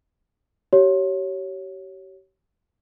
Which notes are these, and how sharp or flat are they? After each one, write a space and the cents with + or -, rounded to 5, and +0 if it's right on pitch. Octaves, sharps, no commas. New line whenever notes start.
G4 -35 C#5 +0